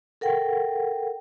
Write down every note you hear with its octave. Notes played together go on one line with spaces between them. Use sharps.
A4 A#4 F#5 G5